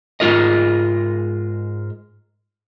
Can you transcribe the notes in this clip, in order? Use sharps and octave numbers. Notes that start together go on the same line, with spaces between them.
G#2 G#3 D#4 F4 A#4 D#5